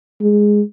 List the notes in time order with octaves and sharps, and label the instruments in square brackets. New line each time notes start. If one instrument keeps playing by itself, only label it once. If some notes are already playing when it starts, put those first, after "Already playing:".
[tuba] G#3